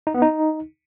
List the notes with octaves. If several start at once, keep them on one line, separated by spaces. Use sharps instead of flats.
D#4
B3
D#4